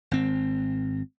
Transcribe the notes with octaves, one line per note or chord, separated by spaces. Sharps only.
G#1 C4